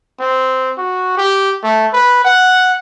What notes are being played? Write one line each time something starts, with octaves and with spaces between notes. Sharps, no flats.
C4
F#4
G4
A3
B4
F#5